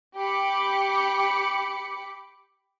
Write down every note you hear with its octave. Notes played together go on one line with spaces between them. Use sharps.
G4 B5 D6 C#7